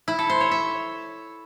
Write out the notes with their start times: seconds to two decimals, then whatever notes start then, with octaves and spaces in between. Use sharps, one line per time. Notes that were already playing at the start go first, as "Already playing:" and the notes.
0.08 E4
0.19 A4
0.30 C5
0.40 C#5
0.51 E5